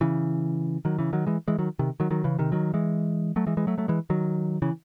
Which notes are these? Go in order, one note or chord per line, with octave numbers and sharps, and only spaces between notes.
C#3 E3
D#3 F#3
C#3 E3
D#3 F#3
E3 G#3
E3 G#3
D#3 F#3
C3 D#3
D#3 F#3
D#3 F#3
C#3 E3
C3 D#3
D#3 F#3
E3 G#3
F#3 A3
E3 G#3
E3 G#3
F#3 A3
F#3 A3
E3 G#3
D#3 F#3
C#3 E3